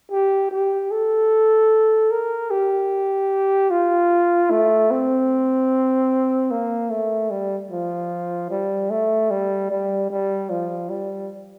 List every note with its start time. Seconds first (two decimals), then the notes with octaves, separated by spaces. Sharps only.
0.11 G4
0.52 G4
0.91 A4
2.11 A#4
2.51 G4
3.71 F4
4.51 A3
4.91 C4
6.51 A#3
6.90 A3
7.30 G3
7.71 F3
8.50 G3
8.90 A3
9.31 G3
9.70 G3
10.10 G3
10.50 F3
10.90 G3